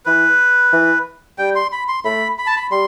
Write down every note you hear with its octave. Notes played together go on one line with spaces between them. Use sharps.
E3 B4
E3
G3 G5
C6
B5
C6
A3 B5
B5
A5
B5
G3 C6